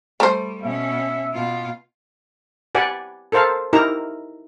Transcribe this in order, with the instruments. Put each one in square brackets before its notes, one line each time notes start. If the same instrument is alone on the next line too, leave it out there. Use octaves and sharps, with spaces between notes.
[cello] G3 [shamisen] A3 C5
[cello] B2 C#4 [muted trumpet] E5
[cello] B2 F4
[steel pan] G4 B4 D5 F#5 G#5
A4 A#4 C5 F5 A5
D#4 E4 G4 A#4 A#5